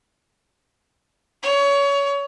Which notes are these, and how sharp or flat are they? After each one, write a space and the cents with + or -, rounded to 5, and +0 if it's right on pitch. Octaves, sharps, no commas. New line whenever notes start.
C#5 +25